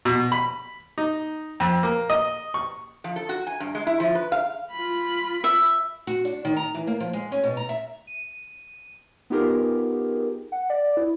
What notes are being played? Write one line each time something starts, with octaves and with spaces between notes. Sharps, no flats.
B2
B5
D#4
F2
A#3
D#5
C#6
F3
A4
F#4
G#5
G2
G#3
E4
F3
B4
F5
F4 B5
E5
F#4
D4
D#3
A#5
E3
A#3
F3
G#3
C#4
B2
A#5
E5
D#7
B3 D#4 F4 G4 G#4 A#4
F#5
D5
E4